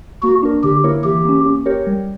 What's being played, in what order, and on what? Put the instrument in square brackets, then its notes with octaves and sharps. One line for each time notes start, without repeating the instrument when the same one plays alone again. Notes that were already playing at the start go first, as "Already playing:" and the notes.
[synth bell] A#3 [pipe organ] F#4
[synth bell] D4 A#4
[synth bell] D3 [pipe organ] G4
[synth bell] A#3 E4 A#4 C#5
[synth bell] E3 [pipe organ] G4
[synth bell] A#3 C#4
C#4
G4 A#4 C#5
G3